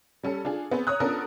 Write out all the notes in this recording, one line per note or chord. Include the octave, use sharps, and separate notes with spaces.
G3 C#4 A4 C#7
D4 F4 G#4
B3 C4 G#4 B4
C#5 A#5 D#6 F#6
B3 C#4 D4 F4 A4 A#4